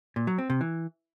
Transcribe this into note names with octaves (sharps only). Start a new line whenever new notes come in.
A#2
F#3
C4
C3
E3